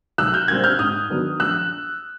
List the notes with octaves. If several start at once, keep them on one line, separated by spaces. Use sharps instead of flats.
B1 E6 F#6
F6 G6
A#2 G3 C4 F#6 G#6
F6 G6
G#2 D#6 F6
D#3 F#3 B3 D4
A#1 E6 F#6